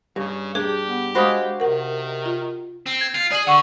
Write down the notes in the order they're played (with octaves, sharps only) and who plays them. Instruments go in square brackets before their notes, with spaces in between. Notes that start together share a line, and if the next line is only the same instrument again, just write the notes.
[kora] G2 [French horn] C#3
[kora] D4 [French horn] G4 [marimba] G#4
[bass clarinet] B3
[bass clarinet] G#3 [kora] F#4 C5 F5 [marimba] B5 D6 D#6
[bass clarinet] C3 [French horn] D#3 [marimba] A#4 F#5
[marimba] F4
[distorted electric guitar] C4
[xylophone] G#6
[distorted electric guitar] F4 [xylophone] C7
[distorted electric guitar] G#4 [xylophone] D5 F#7
[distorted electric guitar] D3 [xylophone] F#5 C#6